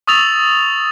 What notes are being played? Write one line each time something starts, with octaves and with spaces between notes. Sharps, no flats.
C#6 D#6 E6 A6 F7